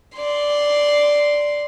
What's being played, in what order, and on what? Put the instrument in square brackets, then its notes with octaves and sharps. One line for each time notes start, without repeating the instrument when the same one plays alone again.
[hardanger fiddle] D5 C6